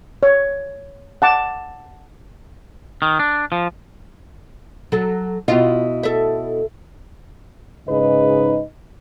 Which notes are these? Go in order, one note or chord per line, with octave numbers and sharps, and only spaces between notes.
C#5
F#5 A5 D6
D#3
D4
F3
F#3 A4
B2 E4 F4 D#5
A4 E5
G#2 C#3 D#4 B4 D#5